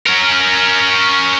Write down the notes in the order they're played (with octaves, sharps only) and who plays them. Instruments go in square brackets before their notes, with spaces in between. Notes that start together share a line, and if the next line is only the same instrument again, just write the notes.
[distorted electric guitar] C#4 A#4